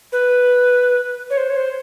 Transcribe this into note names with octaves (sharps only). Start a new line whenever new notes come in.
B4
C#5
C5
C#5
C5